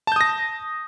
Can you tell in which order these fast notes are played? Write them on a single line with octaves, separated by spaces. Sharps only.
A5 G6 D#6 A#6